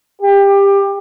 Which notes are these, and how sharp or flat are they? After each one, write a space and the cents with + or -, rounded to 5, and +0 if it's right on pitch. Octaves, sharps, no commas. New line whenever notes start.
G4 +20